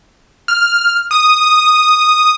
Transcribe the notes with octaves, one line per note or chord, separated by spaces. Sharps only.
F6
D#6